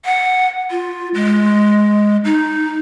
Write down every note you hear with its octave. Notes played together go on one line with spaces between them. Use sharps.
F#5
F4
G#3
D#4